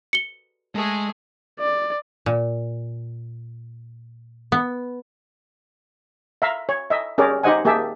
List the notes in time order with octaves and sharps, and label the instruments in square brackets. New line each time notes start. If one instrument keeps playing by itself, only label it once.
[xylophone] C#7 G7
[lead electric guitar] G#3 [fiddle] A3 G#4
[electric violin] D5
[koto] A#2
B3
[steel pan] E5 F5 A#5
C#5
D#5 E5
C#4 G4 G#4 A#4 C#5 D5
D#4 G4 C5 D#5 F#5 G#5
A#3 G4 G#4 E5 A5